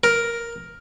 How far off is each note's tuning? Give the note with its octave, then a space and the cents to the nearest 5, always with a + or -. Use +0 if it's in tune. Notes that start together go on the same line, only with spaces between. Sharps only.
A#4 +5